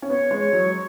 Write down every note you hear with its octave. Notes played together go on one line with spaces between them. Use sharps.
C#4
B3 C#5
G#3
C#5
F#3